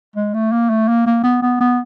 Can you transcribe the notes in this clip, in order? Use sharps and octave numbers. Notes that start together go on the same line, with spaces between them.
G#3
A3
A#3
A3
A#3
A#3
B3
B3
B3